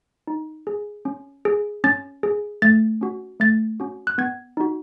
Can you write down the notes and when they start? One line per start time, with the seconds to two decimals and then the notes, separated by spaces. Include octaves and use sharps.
0.27 D#4
0.67 G#4
1.05 C#4
1.45 G#4
1.84 C#4 A6
2.23 G#4
2.62 A3 A6
3.01 C#4 F#4
3.40 A3 A6
3.80 C#4 F#4
4.07 F#6
4.18 B3 G#6
4.57 D#4 F#4